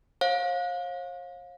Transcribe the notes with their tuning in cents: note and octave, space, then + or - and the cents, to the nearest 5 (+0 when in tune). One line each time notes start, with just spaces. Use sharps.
C#5 -45 F5 +25